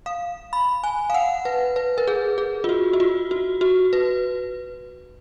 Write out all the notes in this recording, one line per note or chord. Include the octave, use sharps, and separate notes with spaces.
F5
B5
G#5
F5
F#5
B4
B4
A#4
G#4
G#4
F4
F#4
F#4
F4
F#4
F#4
B4